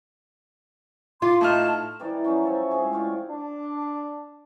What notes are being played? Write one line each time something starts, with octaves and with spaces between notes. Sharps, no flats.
F4 C6 D6
A2 D#4 A5 F6
E3 G3 D#4 D5
F#3 C#4 D#4 A5
F3 C#5 E5
A2 C3 G#3 G#4
F4 G4 C#5 D5
D4